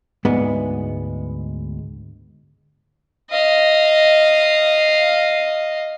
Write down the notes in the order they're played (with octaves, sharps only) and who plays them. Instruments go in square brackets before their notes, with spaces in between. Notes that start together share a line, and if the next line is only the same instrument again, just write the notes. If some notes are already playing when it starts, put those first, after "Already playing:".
[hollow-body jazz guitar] D2 G#2 G#3 B3
[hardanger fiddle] D#5 F5